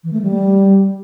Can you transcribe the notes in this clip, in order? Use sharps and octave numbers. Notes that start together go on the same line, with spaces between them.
E3
A3
G3